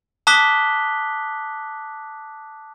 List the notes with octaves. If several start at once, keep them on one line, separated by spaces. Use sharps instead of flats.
A5 D6 D#6 F#6 B6 G7